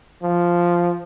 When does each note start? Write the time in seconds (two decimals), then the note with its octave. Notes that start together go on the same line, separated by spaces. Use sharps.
0.23 F3